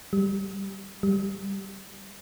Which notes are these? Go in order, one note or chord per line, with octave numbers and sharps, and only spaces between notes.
G3
G3